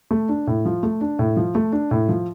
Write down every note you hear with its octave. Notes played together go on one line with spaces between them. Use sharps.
A3
D4
A2
F3
A3
D4
A2
F3
A3
D4
A2
F3